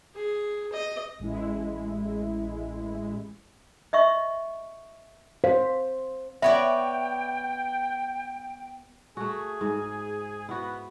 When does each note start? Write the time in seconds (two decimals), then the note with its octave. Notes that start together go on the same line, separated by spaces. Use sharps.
0.15 G#4
0.72 D#5
1.19 A1 G#3 E4
3.93 D#5 E5 C#6
5.44 C5 F5
6.42 B3 C#5 D5 E5 G5
9.17 A3 F#4 G#4
9.61 G#2
10.49 B3 E4 F#4